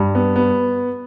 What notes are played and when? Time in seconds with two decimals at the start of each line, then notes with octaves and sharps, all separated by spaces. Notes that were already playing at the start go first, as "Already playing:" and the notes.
Already playing: G2
0.15 B3
0.36 B3